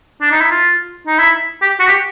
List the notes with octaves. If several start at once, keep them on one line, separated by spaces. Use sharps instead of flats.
D4
D#4
E4
F4
D#4
E4
G4
F#4
G4